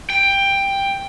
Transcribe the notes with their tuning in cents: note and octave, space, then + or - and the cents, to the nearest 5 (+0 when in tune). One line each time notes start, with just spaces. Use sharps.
G5 +10